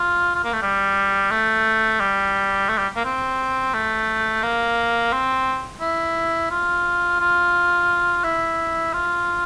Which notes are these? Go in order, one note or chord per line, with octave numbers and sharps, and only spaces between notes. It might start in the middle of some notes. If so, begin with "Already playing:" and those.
Already playing: F4
F4
A#3
A3
G3
A3
G3
A3
G3
A#3
C4
A3
A#3
C4
E4
F4
F4
E4
F4